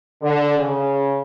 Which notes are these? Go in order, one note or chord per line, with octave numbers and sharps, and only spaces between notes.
D3
C#3